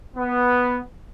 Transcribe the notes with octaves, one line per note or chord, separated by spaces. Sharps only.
B3